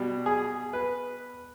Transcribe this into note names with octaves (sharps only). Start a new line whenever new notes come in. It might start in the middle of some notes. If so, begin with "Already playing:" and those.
Already playing: B2 G3
G#4
B4